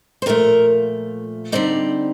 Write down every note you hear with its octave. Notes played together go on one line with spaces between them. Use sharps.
C5
A#2 F3 A3 A#4
D3 G3 C4 D#4 D5